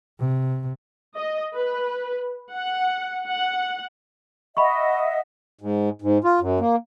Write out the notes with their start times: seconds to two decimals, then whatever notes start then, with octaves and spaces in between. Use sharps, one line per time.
0.20 C3
1.16 D#5
1.55 B4
2.52 F#5
3.27 F#5
4.57 D#5 E5 F#5 B5 C#6
5.61 G#2
6.02 G#2
6.24 F4
6.41 F#2
6.60 A#3